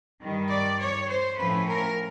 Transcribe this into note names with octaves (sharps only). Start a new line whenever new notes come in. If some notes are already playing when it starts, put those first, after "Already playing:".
G2 D#3 G3
D5
C#5
C5
A2 F3 A3 C#4 B4
A#4